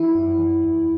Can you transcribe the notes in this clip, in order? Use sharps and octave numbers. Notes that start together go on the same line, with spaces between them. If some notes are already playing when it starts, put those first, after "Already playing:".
Already playing: E3 E4
F#2
E3
E2